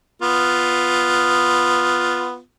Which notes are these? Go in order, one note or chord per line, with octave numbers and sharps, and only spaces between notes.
B3 F4